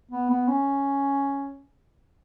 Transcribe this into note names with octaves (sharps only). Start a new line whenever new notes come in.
B3
B3
C#4